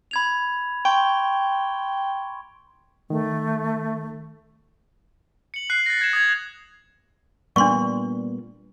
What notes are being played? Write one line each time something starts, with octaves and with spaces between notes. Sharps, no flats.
B5 G#6 F7
G5 C6 C#6 D7
D#3 A3
C#7 F#7
F#6 C7
A6 A#6
G#6 E7
D#6 G#6
A#2 G3 B3 D4 C6 C#6